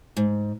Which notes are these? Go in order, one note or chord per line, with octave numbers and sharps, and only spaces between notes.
G#2